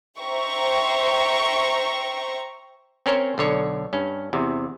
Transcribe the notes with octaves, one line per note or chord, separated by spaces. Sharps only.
C5 E5 G5 A#5 C#6
C4 C#4 A#4 C5 C#5
B1 D3 C#5
G2 C#4
E2 C3